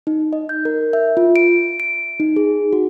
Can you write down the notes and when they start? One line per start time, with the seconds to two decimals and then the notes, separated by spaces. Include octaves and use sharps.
0.07 D#4
0.33 D#5
0.49 G6
0.65 A#4
0.93 E5
1.17 F4
1.36 D7
1.80 D7
2.20 D#4
2.36 G#4
2.73 F#4